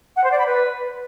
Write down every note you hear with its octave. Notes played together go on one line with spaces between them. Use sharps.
F#5
C5
D5
B5
B4